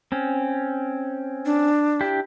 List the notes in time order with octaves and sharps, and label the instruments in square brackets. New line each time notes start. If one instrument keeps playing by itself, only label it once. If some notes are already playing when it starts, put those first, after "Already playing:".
[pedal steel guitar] C4 C#4
[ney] D4
[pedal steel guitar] D4 E4 G4